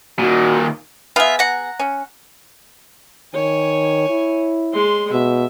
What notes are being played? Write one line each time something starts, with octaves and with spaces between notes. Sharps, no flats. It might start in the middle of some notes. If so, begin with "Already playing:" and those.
A#2 D#3 F#4
B3 F4 G#4 E5
F#5 A#5
C#4
D#3 C#5 G#5
E4
G#3 C6
B2 E5